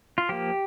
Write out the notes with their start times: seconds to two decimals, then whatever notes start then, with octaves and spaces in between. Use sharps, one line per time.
0.18 F4
0.29 F3 A#3 G4